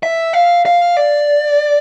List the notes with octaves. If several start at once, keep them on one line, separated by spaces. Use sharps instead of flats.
E5
F5
F5
D5